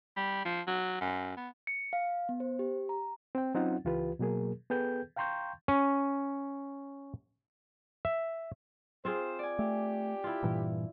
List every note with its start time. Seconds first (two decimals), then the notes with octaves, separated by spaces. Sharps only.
0.16 G3
0.45 F3
0.67 F#3
1.01 F#2
1.37 B3
1.67 C#7
1.93 F5
2.29 B3
2.40 C5
2.59 G4
2.89 A#5
3.35 C4 G5
3.54 F#3 C4 C#4 D#4 F4 F#5
3.85 C#2 E3 F4 G4 B4
4.19 B2 F#3 A#3 G#4 A#4
4.70 B3 G#4 A4 B4 G5 G6
5.16 F5 G5 A#5 C6 C#6 G6
5.68 C#4
8.05 E5
9.05 C4 F4 G#4 C5
9.39 D5 G#5
9.59 A3 G4
10.24 E4 F4
10.43 G2 A#2 E3